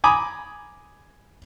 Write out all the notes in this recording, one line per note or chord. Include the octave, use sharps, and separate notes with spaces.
G#5 A#5 B5 D6 D#6